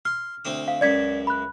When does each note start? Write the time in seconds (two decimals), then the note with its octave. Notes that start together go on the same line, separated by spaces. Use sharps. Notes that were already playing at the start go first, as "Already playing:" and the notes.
0.05 C6 F6
0.45 D2 C4 D#6
0.68 F5
0.81 C#2 F#2 D5 G#6 B6
1.27 B5 F#6